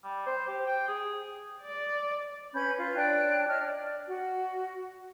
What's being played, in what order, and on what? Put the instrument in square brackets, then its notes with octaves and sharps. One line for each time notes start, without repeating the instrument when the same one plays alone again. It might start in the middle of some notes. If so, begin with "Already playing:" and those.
[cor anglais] G3
C5
G4
G5
G#4
[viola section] D5
[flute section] C#4 B4 B5 G6
F4 B4
D4 C#5 G5 F#6
C#5 D#5 A5 F6
D5
F#4